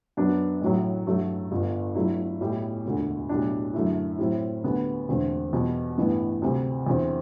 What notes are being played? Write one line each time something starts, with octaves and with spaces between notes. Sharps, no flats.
F#2 F#3 B3 D4
A1 A2 F#3
A1 G2 F#3 A3
G1 G2 D3
G2 F#3 A3 E4
B1 A2 G3
E1 D2 D3
B1 A2 G3 D4
F#2 D3 A3 E4
A2 F#3 C4 E4
D2 D3 G3 B3
E1 E2 D3 A3 C4
E2 B2 G3
A1 G2 E3 B3
D2 C3 G3
E2 D3 G3 C4 E4